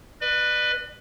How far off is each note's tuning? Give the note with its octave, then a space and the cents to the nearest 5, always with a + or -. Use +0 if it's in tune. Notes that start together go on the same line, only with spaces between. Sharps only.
B4 +0 D5 +40